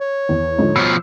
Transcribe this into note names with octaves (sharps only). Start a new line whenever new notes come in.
C#5
E2
G#2 D3 F3
B2 F3 E6